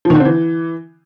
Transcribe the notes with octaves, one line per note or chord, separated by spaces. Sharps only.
F3
D#3
D3
C4
E3